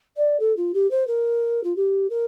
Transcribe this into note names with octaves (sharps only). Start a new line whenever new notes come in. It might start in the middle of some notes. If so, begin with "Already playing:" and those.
D5
A4
F4
G4
C5
A#4
F4
G4
A#4